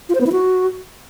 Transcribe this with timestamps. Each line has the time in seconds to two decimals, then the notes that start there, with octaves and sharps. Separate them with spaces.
0.09 F4
0.15 C5
0.21 B3
0.26 E4
0.32 F#4